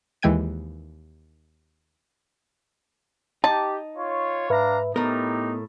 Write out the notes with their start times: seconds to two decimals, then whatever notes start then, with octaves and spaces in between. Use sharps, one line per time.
0.22 D#2 E3 G#3 G5 G#6 D#7
3.44 D#4 G4 A5
3.96 F4 C#5
4.50 G#2 D4 B4 E5 F5 A#5
4.96 A2 B3 D#4 E4 G4 A#4